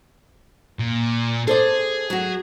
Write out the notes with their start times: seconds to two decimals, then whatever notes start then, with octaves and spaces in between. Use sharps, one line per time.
0.79 A#2
1.48 G#4 A4 C5 D5
2.10 F#3 F#4